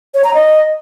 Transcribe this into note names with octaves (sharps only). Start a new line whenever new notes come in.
C#5
A#5
D#5